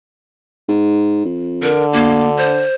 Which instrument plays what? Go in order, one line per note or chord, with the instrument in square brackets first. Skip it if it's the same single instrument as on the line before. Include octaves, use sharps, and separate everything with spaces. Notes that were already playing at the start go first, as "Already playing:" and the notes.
[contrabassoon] G#2
F2
[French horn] D3 [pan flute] A#4
[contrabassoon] D2 [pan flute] A#3
[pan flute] C5